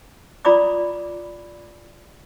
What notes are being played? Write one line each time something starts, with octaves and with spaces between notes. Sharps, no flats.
F4 D5 A#5 B5 D6 D#6